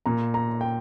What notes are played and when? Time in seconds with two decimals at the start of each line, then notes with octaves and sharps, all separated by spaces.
0.06 A#2 A#5
0.34 A#5
0.61 G5